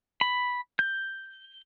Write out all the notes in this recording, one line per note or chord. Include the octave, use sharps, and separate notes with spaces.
B5
G6